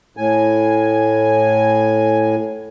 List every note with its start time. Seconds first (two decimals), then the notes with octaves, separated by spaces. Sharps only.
0.17 A2 G#5